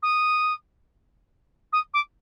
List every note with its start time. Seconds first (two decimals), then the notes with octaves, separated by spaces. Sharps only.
0.02 D#6
1.72 D#6
1.93 D6